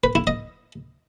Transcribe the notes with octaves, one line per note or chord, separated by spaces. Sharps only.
B4
E4
D#5